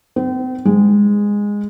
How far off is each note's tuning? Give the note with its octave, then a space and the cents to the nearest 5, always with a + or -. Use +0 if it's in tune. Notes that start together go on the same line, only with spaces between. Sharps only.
C4 -40
G#3 -15